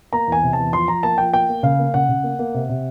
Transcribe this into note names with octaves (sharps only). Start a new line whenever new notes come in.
A#3 A#5
E2 G#5
C3
E2 A5
F3 C6
F3 A#5
A#3 A5
F3 G5
A#3 G5
A#3
C#3 F5
A#3
C#3 F#5
C#3
A#3
A#3
C3
C3